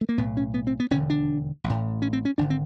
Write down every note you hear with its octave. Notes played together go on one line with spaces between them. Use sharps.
A3
A#3
B1 A2 B3
C#4
B3
C4
B3
E1 D#2 D3 C#4
D4
A1
A2
C#4
C4
C#4
G#1 D3 D4
C4